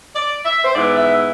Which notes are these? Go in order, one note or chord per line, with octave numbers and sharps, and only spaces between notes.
D5
E5
C5
G#2 E3 B3 E4 D5
E5